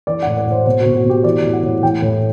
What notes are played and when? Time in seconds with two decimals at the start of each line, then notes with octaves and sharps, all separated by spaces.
0.07 E3 D5
0.22 A2 F#5
0.37 D5
0.47 A2 C5
0.66 B2 C5
0.81 F#4
0.86 B2
0.95 F#4
1.04 B2
1.09 G4
1.24 E3 D5
1.44 A2
1.53 F#5
1.63 A2
1.82 E3 G5
2.02 A2